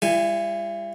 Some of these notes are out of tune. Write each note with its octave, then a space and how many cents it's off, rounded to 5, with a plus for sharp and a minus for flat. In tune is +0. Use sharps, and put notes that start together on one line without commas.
G3 +45 E4 +45 G#5 +0